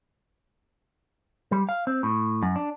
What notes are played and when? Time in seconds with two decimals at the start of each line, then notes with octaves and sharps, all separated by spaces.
1.52 G3
1.69 F5
1.87 C4
2.03 A2
2.43 F#2
2.56 D4